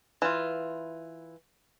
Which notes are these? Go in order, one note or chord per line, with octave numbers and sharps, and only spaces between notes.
E3 F4